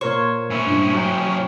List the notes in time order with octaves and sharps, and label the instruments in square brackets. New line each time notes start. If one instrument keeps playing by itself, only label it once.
[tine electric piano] A#2 A#4 C#6 [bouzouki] C5 C#5
[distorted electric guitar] C#4 E4
[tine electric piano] G2 A#2
F#3 G5